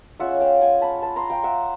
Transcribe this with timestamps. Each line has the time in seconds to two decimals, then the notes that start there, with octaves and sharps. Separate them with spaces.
0.20 G#3 C#4 F4 E5 F#5
0.40 F5 G5
0.61 F#5 G#5
0.81 A5 B5
1.02 A5 B5
1.16 A#5 C6
1.30 F5 G5
1.44 E5 F#5